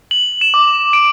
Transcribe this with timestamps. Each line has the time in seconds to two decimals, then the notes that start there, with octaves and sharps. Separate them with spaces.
0.11 F#7
0.41 E7
0.54 D6
0.93 D7